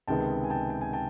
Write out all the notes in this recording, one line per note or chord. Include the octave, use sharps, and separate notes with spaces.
C#2 C3 D#3 G#3 B3 G5 A5
G#5
G5 A5
G5
G#5
G5 A5